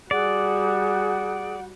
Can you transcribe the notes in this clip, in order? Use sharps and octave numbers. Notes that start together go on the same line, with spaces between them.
G3 F#4 G#4 D5 F#5